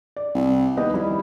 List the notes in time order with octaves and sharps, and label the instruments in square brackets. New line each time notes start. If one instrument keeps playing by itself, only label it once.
[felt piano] D5
[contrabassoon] C2
[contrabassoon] D#2 [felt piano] B3 G4 D#5
[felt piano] G3 E4